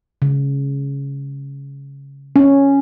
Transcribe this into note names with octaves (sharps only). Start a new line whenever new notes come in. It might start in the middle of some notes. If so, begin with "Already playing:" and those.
C#3
C#4